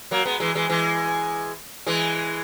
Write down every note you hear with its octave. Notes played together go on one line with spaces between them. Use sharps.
F#3 A#3
G#3 B3
E3 G#3
E3 G#3
E3 G#3
E3 G#3